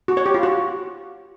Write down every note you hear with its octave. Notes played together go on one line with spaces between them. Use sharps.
F#4
C#5
G4
F4
F#4